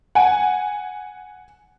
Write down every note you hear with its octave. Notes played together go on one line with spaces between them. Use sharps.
F#5 G#5